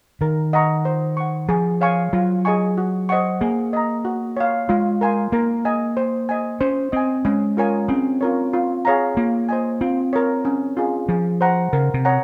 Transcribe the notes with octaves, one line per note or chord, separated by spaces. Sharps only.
D#3 A#4
D#5 F#5 A#5 C#6
C5
F#5 C#6
F3 G#4
C#5 F5 G#5 C#6
F#3 F4
G#4 D#5 G#5 C#6
F#4
C5 D#5 F#5 C#6
A#3 G#4
D#5 A#5
F#4
C#5 F5
G#3 F4
A#4 F5 G#5 C6
A#3 A#4
D#5 G#5
C5
D#5 G#5
C#4 C5
C4 D#5 G#5
G#3 C#4
F4 A#4 C#5 G#5
C4 C#4
F4 A#4 C#5
F4
G#4 C#5 F5 A#5
A#3 F4
C5 D#5 G#5
C4 F4
A#4 C#5
C#4
F4 G#4
F3 G#4
C5 F#5 A#5
C#3 A#4
C3
C#5 F#5 A#5